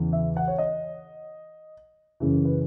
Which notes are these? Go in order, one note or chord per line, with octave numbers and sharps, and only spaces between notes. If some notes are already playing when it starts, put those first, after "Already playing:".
Already playing: E2 C#3 E3
E5
F#5
C#5
D#5
F#2 C#3 E3
B4